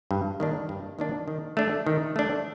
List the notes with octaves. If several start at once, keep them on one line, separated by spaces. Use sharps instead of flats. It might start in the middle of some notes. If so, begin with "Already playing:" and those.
G2
D#3 A#3 D4
G2
D#3 A#3 D4
D#3
A3 D4
D#3
A3 D4